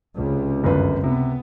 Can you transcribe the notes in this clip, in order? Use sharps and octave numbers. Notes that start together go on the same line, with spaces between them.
C#2 C3
G1 F#2 B4
C3 B3